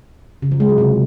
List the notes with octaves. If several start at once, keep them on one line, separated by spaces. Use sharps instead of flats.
C#3
F3
G#3
F#3
C3